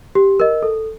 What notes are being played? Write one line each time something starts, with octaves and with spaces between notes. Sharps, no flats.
G4
A#4 D#5
A4